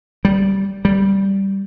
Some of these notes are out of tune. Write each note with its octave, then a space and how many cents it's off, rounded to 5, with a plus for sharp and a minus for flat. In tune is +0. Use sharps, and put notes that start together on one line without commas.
G3 -10
G3 -5